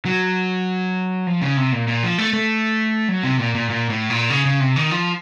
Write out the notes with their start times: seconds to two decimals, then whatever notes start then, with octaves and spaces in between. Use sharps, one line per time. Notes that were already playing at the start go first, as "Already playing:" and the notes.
0.05 F#3
1.27 F3
1.42 C#3
1.57 C3
1.72 A#2
1.88 A#2
2.03 F3
2.18 A3
2.33 A3
3.09 F#3
3.24 C3
3.39 A#2
3.55 A#2
3.70 A#2
3.90 A2
4.10 A#2
4.30 C#3
4.45 C#3
4.60 C3
4.76 D#3
4.91 F3